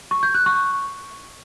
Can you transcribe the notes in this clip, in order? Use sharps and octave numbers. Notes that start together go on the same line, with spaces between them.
C#6
G6
F#6
C#6